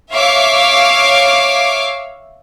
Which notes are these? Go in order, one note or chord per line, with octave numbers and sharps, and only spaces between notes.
C#5 E5 F5 D6